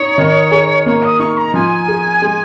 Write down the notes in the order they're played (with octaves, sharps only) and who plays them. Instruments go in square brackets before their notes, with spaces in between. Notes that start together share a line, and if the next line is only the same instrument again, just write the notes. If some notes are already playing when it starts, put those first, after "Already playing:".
Already playing: [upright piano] D#4 [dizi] C#5
[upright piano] D#3
G#4
[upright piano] A#3 [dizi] C#5
[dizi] D#6
[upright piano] D#4 [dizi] C#6
[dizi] A#5
[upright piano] F3 [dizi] G#5
[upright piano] G#4
G#3